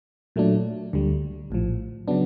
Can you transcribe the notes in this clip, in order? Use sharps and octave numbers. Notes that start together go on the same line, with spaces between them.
A#2 F#3 A3 D4
D2 D3 G3
A#1 A2 F3
C#3 F#3 B3 D4